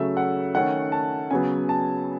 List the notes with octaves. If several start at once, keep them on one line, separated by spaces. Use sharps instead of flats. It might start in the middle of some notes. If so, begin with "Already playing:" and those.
Already playing: C#3 F#3 A3 E5
F#5
D#3 A3 C#4 F#5
A5
C#3 F#3 B3 G#5
A5